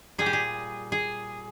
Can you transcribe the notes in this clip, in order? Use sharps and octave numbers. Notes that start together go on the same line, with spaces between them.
A#2 G3 G#4
G4
G#4
G#4